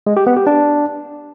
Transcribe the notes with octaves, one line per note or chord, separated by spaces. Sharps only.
G#3
G4
B3
G4
D4